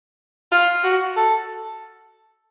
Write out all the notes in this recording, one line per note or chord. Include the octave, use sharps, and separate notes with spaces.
F4
F#4
A4